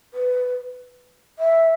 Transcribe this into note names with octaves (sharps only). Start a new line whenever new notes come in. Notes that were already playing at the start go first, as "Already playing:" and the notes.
B4
E5